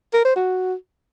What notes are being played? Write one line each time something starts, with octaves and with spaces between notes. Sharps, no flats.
A#4
C5
F#4